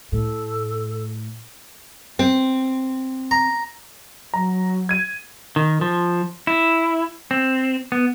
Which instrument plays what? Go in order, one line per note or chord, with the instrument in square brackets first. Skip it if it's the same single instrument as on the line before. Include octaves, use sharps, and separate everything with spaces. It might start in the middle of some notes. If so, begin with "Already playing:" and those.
[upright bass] A2 [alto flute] A4
[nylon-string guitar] C4
[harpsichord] A#5
[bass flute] F#3 [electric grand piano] A#5
[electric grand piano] G#6 D#7
[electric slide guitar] D#3
F3
E4
C4
B3